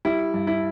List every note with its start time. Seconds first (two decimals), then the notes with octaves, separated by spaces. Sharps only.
0.05 G3 E4
0.34 G2
0.47 E4